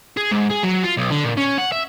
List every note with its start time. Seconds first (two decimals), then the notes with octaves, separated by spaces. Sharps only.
0.17 G#4
0.31 G#2
0.50 G#4
0.63 F#3
0.84 F4
0.97 B1
1.11 D3
1.24 A#2
1.37 C#4
1.58 F#5
1.72 E5